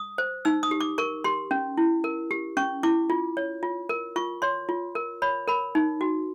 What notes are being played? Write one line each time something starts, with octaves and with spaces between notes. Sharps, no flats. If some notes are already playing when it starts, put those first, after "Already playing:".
Already playing: D#6
C5
D#4 E6
D#6
G4
D6
A#4 C#6
G4 C6
C#4
E4
A#4
G4
C#4 C#6
E4 D6
F4
C#5
F4
A#4
F4 C#6
C#5 C6
F4
A#4
C#5 B5
A#4 B5
D#4
F#4